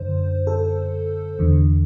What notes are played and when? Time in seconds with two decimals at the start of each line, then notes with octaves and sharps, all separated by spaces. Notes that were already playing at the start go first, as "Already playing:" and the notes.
Already playing: F#2 D3 C5
0.47 A4
1.39 E2 D3